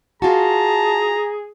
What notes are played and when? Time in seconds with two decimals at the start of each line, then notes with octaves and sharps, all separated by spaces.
0.22 F4 F#4 G#4 A5 A#5